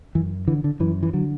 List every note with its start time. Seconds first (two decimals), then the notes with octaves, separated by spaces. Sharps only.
0.15 F#2 E3
0.47 D3 E3
0.64 D3
0.80 F#2 E3
1.03 E3
1.13 D3 F#3